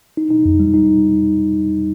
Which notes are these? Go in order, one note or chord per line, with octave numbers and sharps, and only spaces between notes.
D#4
D#4
F2
G3
D#4